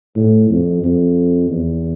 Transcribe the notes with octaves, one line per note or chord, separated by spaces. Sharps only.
A2
F2
F2
E2